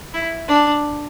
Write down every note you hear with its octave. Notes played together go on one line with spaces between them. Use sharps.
E4
D4